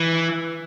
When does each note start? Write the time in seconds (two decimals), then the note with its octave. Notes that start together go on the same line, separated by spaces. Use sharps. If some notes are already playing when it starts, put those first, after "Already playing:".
Already playing: E3